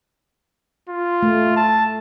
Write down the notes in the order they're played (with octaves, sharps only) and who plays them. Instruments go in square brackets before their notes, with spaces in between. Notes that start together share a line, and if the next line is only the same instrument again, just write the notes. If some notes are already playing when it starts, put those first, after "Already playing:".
[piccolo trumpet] F4
[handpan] A3
[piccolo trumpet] A5